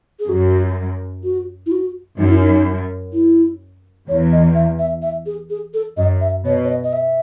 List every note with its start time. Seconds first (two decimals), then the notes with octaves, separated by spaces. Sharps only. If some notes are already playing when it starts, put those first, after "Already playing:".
0.20 G#4
0.29 F#2 F#4
1.23 F#4
1.66 E4
1.72 F#4
2.18 F#2 D#4
2.29 E4
2.40 D#4
3.13 E4
4.08 E2 C#5
4.32 D#5
4.55 E5
4.79 E5
5.02 E5
5.26 G#4
5.50 G#4
5.74 A4
5.97 F#2 D#5
6.21 E5
6.45 B2 C#5
6.64 C#5
6.69 D#5
6.83 D#5
6.93 E5